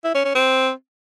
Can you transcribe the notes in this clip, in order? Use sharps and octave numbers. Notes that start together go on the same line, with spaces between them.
E4
C#4
C#4
C4